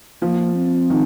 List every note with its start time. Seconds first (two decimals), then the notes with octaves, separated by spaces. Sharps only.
0.22 F3 A#3
0.55 C4
0.90 D#3